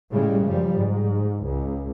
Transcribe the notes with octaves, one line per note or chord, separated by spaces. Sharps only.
A2 C#3 G3 G#3
F#2 F3 G3
G#2
C#2